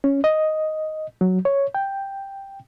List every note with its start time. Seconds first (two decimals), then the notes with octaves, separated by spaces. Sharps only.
0.04 C#4
0.24 D#5
1.21 F#3
1.45 C#5
1.75 G5